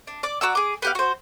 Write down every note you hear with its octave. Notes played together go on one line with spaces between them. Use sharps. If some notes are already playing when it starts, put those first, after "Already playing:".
D4
D5 D6
F#4 D5 A#5 E6
G#4 D6
B3 G4 F5
F#4 C5